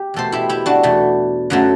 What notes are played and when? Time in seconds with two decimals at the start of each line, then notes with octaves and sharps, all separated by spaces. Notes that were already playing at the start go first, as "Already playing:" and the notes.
Already playing: G4
0.14 E2 B2 A3 A4 C5
0.32 E4 G4
0.49 E4 G4
0.66 D4 F#4
0.83 E2 B2 A3
1.50 F#2 F#3 A3